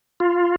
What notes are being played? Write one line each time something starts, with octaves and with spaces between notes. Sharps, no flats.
F4